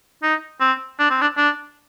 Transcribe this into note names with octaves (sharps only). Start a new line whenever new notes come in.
D#4
C4
D4
C4
D4
D4